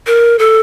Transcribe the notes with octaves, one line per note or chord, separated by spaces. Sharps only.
A#4
A4